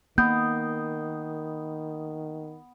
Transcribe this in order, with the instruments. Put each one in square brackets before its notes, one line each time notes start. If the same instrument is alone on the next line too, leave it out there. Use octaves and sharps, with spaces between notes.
[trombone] D#3 [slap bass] A#3 [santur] B3 D#5 [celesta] G6